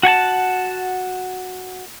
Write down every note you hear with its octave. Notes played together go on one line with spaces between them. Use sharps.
F#4 F#5 G#5 A5